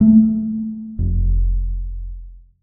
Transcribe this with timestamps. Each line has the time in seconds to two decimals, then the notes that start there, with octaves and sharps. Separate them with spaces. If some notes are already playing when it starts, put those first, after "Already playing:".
0.01 A3
0.99 F1